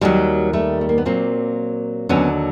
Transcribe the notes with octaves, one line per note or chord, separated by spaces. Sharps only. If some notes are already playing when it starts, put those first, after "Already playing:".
D#2 D#3 F#3 G3 A3
G3 A3
A3
A#3
B3
A#2 F#3 A#3 C4
D#2 D3 F#3 B3 C#4